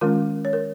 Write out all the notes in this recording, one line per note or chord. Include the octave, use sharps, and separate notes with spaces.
D#3 G#3 C#4 F4 A#4
C#5
A#4